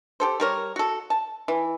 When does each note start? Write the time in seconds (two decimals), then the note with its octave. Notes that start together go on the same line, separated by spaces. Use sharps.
0.20 G4 A4 C5
0.40 G3 A#4 C#5
0.76 F#4 A4
1.10 A5
1.48 E3